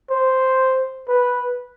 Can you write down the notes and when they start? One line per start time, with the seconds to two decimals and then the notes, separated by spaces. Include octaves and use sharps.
0.10 C5
1.08 B4